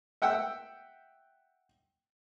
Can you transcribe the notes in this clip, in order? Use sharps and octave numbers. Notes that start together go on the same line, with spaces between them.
E5 F#5 G5 E6